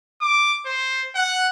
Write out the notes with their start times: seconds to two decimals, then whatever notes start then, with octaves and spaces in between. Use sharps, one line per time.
0.21 D6
0.66 C5
1.15 F#5